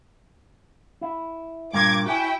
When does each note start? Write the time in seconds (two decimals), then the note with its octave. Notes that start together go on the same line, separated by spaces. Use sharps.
1.01 E4
1.73 G2 A#2 A#3 D6 G#6
2.06 E4 F#4 G5 G#5